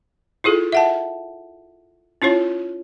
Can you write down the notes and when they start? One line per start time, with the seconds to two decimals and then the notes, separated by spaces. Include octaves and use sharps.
0.44 E4 F4 G#4 A4
0.72 E5 F#5 A5
2.22 C#4 E4 F4 C#5